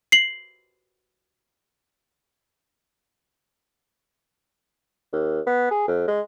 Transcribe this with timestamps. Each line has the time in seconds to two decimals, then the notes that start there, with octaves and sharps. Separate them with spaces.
0.12 C7 F#7
5.12 D#2
5.47 B3
5.71 G#4
5.88 F2
6.08 G#3